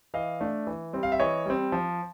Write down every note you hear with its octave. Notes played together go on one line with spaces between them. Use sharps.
E3 D#5 F5
A3 D4
E3
G3 C4
F5
E5
E3 C#5 D#5
G3 C4
F3